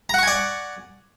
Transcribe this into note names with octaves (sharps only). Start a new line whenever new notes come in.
D5 F#5 G#5 A#5 C#6